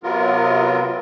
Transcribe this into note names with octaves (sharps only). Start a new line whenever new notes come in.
C3 F#3 B3 F4 A#4